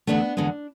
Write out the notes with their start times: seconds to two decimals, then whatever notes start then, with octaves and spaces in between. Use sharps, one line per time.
0.07 E2 D3 A3 B3 D4
0.37 E2 D3 G#3 B3